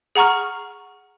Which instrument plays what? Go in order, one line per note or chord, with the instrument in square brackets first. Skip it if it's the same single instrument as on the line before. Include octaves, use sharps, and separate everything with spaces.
[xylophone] G#4 F#5 A#5 C#6 F6